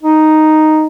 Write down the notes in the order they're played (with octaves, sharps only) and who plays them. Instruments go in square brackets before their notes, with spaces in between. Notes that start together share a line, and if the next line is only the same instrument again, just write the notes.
[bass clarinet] D#4